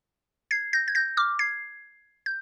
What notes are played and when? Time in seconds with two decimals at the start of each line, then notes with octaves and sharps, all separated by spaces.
0.51 G#6 C7
0.73 G6 A#6
0.88 G#6
0.95 G6 A#6
1.17 D6 F6
1.39 G#6 C7
2.26 G6